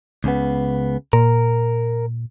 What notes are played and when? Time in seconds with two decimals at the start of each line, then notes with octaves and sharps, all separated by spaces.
0.24 C#2 C#3 B3
1.13 A#2 A#4